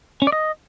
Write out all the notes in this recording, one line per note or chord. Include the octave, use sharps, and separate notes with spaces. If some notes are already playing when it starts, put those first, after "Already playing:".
C#4
D5
D#5